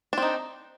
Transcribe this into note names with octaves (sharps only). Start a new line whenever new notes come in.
C4 D4 D#4